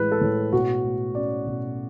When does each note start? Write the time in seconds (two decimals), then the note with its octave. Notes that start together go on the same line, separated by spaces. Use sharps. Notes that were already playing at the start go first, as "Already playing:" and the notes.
Already playing: A2 E3 G#3 B4
0.12 A4
0.21 A2
0.52 B2 F#4
0.84 A3
1.15 C#4 D5
1.47 B2